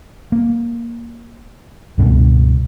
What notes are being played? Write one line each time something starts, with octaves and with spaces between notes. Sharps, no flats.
A#3
C#2 G2 B2